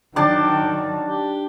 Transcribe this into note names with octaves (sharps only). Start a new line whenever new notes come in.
D#3 F#3 D4 G5 A5 D6
G4